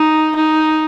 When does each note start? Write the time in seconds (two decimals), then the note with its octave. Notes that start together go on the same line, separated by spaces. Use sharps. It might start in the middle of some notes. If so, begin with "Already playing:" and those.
Already playing: D#4
0.35 D#4